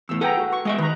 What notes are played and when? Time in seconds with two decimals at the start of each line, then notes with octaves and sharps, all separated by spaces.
0.09 E2 A2 E6
0.21 G#4 A4 B4 F#5 G5 A#5
0.37 F#4
0.53 C#6
0.65 G#3 D#5 E5
0.78 D#3 B4 A#5